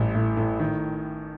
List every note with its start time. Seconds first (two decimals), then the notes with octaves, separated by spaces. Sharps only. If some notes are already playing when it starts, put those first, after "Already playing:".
Already playing: A1 G3
0.14 A2
0.37 A2
0.60 D#3